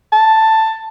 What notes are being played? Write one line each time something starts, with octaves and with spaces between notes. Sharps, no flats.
A5